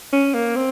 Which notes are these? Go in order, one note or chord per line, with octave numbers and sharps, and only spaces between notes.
C#4
A#3
C4